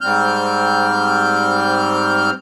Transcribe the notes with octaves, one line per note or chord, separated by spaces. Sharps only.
G#2 G3 C4 F6 G6